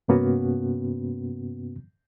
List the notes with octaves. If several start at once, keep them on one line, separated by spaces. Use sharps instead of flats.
G2 C3 A#3 B3 C#4 F#4